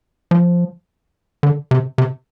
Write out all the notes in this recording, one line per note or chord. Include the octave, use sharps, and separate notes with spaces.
F3
D3
C3
C3